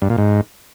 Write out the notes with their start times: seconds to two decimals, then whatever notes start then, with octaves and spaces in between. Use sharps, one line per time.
0.02 G2
0.10 A#2
0.18 G#2